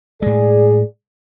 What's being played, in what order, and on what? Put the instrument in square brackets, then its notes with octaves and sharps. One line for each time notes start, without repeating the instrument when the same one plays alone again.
[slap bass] A2 G#3 [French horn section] G#4 D5